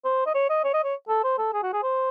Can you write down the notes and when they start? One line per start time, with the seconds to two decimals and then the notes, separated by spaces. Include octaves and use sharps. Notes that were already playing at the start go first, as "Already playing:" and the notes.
0.05 C5
0.26 D#5
0.35 C#5
0.50 D#5
0.64 C#5
0.74 D#5
0.84 C#5
1.09 A4
1.23 C5
1.38 A4
1.53 G#4
1.63 F#4
1.73 G#4
1.83 C5